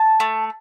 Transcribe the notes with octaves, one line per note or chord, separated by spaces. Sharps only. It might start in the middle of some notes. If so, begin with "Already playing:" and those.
Already playing: A5
A3